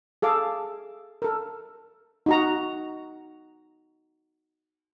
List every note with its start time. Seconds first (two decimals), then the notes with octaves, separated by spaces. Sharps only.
0.22 G#4 A4 F5 D6
1.22 A4 A#4
2.26 D#4 F#4 A#5